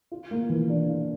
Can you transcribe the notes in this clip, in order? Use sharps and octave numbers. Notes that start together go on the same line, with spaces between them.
F4
A#3
E3
D4
F4